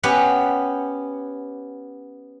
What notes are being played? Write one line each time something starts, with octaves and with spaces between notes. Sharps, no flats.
B3 C#4 G4 F#5